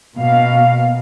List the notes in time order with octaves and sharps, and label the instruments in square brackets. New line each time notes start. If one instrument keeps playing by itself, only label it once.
[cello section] B2 A#3 F5